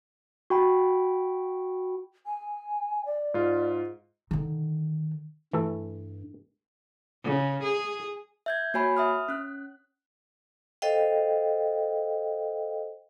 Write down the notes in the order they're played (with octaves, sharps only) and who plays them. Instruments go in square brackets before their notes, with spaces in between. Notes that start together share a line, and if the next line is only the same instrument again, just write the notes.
[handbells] F#4 G5 B5
[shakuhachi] G#5
D5
[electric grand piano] G#2 F4
[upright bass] D3 D#3
[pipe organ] G2 [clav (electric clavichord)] E3 A3 A4
[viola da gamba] C#3
G#4
[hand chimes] E5 G6 G#6
A#3 F#4 C#5 G#5 B5
E5 D#6 F6
C#4 F#6
[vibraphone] A4 C5 D#5 F5 G5